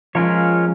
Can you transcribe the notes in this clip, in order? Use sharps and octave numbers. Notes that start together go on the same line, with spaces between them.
F3 G#3 C#4 F4 A#4 C#5